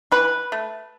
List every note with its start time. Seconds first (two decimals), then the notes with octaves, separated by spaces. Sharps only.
0.12 E3 B4
0.52 A3